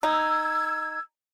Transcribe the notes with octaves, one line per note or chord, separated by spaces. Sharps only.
D#4 E6 G#6